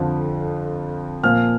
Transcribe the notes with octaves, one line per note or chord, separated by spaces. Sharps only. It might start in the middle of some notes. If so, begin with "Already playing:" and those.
Already playing: F2 D3 F3
A#2 F3 F6